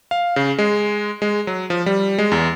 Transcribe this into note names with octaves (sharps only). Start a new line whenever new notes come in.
F5
C#3
G#3
G#3
F#3
F3
G3
G#3
E2